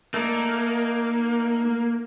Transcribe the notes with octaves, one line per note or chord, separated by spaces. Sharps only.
A3 A#3 D#4 D5